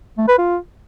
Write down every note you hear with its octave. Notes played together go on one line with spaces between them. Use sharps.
A3
B4
F4